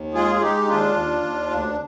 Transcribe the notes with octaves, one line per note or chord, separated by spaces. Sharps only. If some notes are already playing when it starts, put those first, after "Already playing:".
Already playing: D#2
G#3 F4 G#4
F4
G#3 D#4 G4
D#2 D4 F4
D#2
D#2
D2 D4